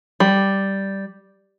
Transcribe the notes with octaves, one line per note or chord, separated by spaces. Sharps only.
G3